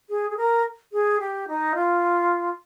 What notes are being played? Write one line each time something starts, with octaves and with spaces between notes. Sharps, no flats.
G#4
G#4
A#4
G#4
G4
D#4
F4